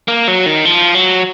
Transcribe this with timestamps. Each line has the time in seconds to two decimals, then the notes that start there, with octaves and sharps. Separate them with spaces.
0.08 A#3
0.28 F#3
0.46 D#3
0.65 F3
0.95 F#3